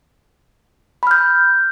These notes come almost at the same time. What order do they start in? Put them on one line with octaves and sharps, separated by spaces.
B5 F6 G6